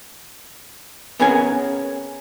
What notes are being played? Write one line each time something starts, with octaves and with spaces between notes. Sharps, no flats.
B3 C#4 G#4 A#4 G#5